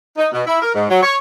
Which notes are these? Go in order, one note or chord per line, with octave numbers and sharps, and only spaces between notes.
D#4
B2
E4
A#4
G#2
F#3
C#5